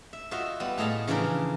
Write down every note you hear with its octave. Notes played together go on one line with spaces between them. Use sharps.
E5
F4 F#4 C5 D#5 E5
G3 B3 F4
A2 A3 G#4 D#5 F5 A5
C#3 E3 F3 D4 A#4 C5